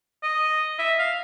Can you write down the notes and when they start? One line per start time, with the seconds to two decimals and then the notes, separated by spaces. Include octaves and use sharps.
0.23 D#5
0.79 E5
0.99 F5